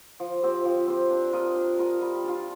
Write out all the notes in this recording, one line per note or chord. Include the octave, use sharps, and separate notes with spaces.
F3
C4 G4 C5
F3
C4 G4 C5
D4
F4 A#4 D#5
D4
F4 A#4 D#5
G3
D4 F4